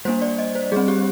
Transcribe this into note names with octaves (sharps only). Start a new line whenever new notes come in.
G3 A#3 D4 C5
D5
D#5
C5
G3 C4 G#4
G4